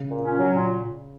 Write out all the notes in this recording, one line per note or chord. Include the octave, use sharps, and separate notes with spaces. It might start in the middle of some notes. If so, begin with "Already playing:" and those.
Already playing: C#3
A#2
C#4
F#3
A#2